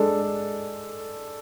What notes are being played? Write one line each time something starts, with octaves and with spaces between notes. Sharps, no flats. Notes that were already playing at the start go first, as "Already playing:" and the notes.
Already playing: G#3 D4 A4